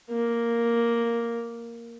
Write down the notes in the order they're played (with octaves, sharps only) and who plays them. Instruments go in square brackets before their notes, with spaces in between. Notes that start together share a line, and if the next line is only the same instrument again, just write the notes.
[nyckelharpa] A#3